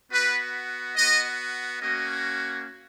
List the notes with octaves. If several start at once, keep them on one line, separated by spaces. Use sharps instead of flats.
B3 F#4 B4
B3 F#4 D#5
A#3 C#4 F#4 D#5